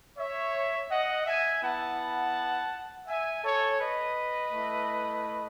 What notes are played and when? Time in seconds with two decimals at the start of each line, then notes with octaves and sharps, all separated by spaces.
0.17 C#5 E5
0.90 D#5 F#5
1.26 E5 G#5
1.63 B3 E4 F#5 A5
3.08 E5 G#5
3.44 A4 C#5
3.80 B4 D#5
4.53 A3 E4